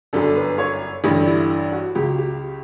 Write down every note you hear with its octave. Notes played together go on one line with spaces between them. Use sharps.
G1 F#2 D3 A4
B4
C#5
A1 G2 D3 G4
E4
F#4
C#2 C#3 F#3 G4
G4